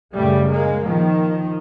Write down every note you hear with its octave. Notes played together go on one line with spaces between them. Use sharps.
F#2 C#3 G3 A3
G#3 A#3
D#3 F3